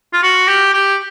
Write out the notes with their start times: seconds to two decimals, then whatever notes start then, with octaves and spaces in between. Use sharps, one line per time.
0.13 F4
0.23 F#4
0.48 G4
0.74 G4